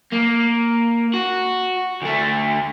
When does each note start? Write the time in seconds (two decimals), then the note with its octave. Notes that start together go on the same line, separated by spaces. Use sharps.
0.12 A#3
1.14 F#4
2.02 D2 A3